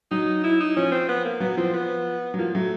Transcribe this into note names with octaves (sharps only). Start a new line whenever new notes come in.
F#3 D#4
E4
D#4
F3 C#4
C4
B3
A#3
F#3 B3
F3 C4
B3
F#3
F3 A#3
F#3 A3